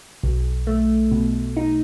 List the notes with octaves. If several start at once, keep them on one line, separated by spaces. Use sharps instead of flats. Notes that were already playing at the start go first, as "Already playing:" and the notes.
B1
A3
B2
D#4